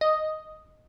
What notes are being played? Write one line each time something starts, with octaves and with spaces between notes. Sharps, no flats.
D#5